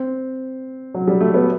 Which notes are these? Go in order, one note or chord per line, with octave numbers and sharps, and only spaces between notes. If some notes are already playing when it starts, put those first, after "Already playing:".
Already playing: C4
F#3
G3
A3
B3